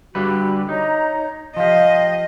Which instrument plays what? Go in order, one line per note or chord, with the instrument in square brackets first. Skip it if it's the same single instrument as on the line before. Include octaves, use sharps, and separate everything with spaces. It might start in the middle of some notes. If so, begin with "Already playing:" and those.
[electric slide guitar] D3 G3 B4 [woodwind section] F#4 G4
[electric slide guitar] D#4 [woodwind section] C#5 D#5 A#5
[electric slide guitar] F3 G4 [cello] D#5 [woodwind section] F5